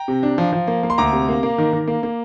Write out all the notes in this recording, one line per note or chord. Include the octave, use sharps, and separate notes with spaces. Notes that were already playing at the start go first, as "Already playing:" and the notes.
Already playing: G5 A#5
C3
D4
F3
F3
A#3
A#3
C6
D2 A#5 D6
C3
A#3
A#3
D#3
D#3
A#3
A#3